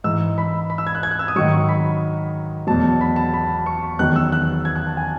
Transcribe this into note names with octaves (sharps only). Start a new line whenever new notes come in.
G#2 E3 E6
B5
B5
E6
G#6
F#6
G#6
F#6
E6
D#6
G#2 D#3 F#3 C#6
B5
E2 B2 F#3 A5
B5
A5
B5
C#6
E2 D#3 F#3 F#6
E6
F#6
G#6
F#6
A5
G#5